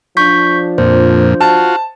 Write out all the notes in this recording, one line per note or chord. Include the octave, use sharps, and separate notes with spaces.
F3 D4 C#6 G6 B6
F2 A#2 C5
F4 F#4 A5